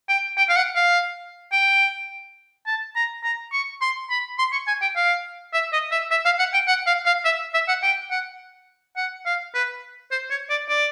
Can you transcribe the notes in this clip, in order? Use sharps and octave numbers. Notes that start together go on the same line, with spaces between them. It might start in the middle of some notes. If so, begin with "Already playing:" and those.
G5
G5
F5
F#5
F5
G5
A5
A#5
A#5
C#6
C6
B5
C6
C#6
G#5
G5
F5
E5
D#5
E5
E5
F5
F#5
G5
F#5
F5
F5
E5
E5
F#5
G5
F#5
F#5
F5
B4
C5
C#5
D5
D5